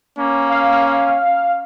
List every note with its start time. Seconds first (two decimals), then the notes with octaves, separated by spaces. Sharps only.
0.18 A#3 C#4
0.49 F5